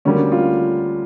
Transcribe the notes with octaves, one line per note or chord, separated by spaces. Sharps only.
D2 D3 G3 A#3 C#4
F4